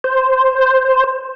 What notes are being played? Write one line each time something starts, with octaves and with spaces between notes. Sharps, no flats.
C5